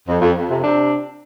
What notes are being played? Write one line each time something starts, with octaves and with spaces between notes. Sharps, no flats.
F2
F2
F2
C3
C3 D4